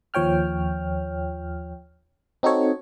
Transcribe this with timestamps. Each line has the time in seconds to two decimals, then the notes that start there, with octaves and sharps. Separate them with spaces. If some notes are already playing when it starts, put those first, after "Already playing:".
0.14 D#2 F3 C#5 G5 F6
2.43 C4 D#4 F#4 A4 C#5